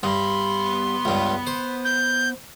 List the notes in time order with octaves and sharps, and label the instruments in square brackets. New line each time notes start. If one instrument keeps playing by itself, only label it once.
[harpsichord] G2 [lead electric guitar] B3 B5 [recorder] C6
[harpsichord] C#2 G2
C5
[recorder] G6